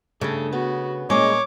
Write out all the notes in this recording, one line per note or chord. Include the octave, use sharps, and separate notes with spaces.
G2 C#3 A3 A4
B3 F#4
A#2 G#3 C#4 C#5 D#5 D6